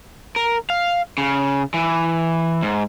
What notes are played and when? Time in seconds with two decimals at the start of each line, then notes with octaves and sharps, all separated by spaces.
0.36 A#4
0.70 F5
1.18 C#3
1.74 E3
2.63 G#2